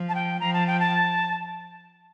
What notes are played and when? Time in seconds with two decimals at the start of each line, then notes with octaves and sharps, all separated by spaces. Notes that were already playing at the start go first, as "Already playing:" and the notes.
Already playing: F3
0.09 A5
0.15 G5
0.40 F3 A#5
0.53 A5
0.67 G5
0.80 A5